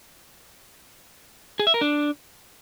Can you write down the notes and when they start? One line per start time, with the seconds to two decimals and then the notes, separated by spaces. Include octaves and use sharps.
1.59 G#4
1.67 E5
1.74 A#4
1.81 D4